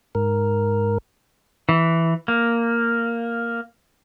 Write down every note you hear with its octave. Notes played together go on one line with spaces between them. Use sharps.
G#2 A#4
E3
A#3